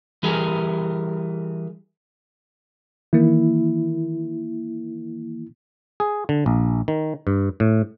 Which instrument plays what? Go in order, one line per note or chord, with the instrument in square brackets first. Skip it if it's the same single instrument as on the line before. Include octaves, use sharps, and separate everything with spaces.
[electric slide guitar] E3 G3 G4 G#4 A#4
[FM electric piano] D#3 E3 A#3 [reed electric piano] E4
[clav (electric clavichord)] G#4
D3
A#1
D#3
G2
A2